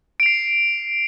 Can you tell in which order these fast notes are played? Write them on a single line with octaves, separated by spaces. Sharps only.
D7 F7 C7